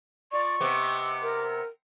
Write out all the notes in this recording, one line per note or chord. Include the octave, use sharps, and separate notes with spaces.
F4 D5 C#6
C3 B3 D#5 G5 D6
A#4